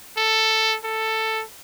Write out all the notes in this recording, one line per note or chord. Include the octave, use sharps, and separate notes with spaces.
A4
A4